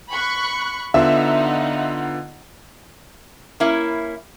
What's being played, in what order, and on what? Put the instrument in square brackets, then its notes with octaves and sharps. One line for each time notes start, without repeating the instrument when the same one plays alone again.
[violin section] B5 C#6 F#6
[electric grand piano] D3 B3 F4 [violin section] D#4 F#5 [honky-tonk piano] E5
[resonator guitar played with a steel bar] A#3 C#4 E4